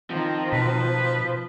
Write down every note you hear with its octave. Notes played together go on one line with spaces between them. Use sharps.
D#3 F3 C4
B2 B4